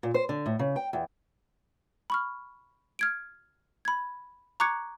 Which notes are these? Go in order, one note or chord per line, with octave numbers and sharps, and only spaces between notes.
A#2
C5
D3
A2
C#3
G5
E2
B5 C#6 F6
F6 G#6 D7
B5 G#6
A#5 C#6 D6 F#6 G#6 C#7